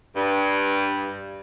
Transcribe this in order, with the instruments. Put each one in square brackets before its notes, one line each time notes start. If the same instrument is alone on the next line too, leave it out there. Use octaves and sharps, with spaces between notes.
[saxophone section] G2